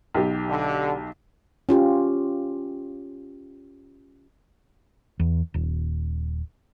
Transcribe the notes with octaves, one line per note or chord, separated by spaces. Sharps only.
B1 G4
D3
C#4 F4 G4
E2
D#1